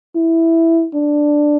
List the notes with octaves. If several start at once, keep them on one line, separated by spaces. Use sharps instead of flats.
E4
D4